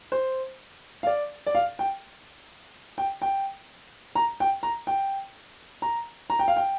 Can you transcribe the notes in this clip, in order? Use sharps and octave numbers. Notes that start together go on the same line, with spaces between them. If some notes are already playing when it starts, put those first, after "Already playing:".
C5
F5
D5
D5
F5
G5
G5
G5
A#5
G5
A#5
G5
A#5
A#5
G5
F5
G5